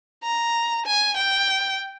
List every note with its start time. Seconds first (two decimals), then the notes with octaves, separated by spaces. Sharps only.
0.24 A#5
0.87 G#5
1.17 G5